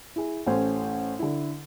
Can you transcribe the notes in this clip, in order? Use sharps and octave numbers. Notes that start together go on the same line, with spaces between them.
E4 G#4
A1 A3 C#4 C5
D3 E4